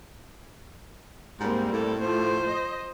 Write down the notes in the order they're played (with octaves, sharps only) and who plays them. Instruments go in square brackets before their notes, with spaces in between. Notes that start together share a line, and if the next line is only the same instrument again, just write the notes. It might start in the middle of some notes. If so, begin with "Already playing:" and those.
[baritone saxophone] G#2 [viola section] G3 A#3 C4
[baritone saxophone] A2 [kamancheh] A4
[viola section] F3 A3 [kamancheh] C5
[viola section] D#5